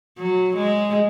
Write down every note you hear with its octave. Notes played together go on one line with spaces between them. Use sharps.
F#3
G#3